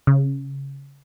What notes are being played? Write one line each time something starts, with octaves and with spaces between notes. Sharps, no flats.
C#3